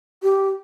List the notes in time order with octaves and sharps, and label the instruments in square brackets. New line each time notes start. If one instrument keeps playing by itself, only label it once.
[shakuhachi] G4